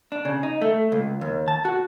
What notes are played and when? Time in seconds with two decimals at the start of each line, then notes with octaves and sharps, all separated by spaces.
0.12 D4
0.25 C#3
0.43 D#4
0.61 A3
0.92 C#2
1.21 D#2
1.48 A5
1.65 F#4